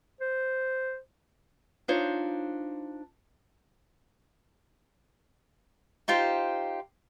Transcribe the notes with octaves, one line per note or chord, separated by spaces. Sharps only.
C5
D4 D#4 F4 C5 C#5
D#4 F4 G4 C5